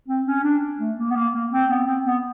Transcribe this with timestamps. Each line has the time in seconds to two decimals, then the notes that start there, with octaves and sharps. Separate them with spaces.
0.09 C4
0.27 C#4
0.44 D4
0.80 A3
0.97 A#3
1.11 B3
1.15 A#3
1.34 A#3
1.52 C4
1.70 B3
1.87 C4
2.05 B3